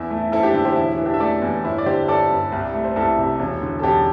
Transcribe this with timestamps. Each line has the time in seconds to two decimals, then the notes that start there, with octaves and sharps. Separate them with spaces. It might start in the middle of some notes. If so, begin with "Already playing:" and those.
Already playing: E2 E4
0.10 A3
0.18 E4
0.32 C4 E4 A4
0.43 D4 G4
0.54 D3 E4
0.65 G4 C5
0.76 E1 E4
0.92 E4
0.98 E3
1.05 D4 G4
1.14 E5
1.20 A3 A4 D5
1.42 E2
1.64 G1 E4
1.78 D5
1.86 D3 G4 C5
2.08 G1 A4 D5
2.30 G2
2.52 C2
2.74 A3
2.84 C5
2.96 C2 E4 A4
3.18 C3
3.40 E1
3.61 D3
3.79 A4
3.83 E1 D4 G4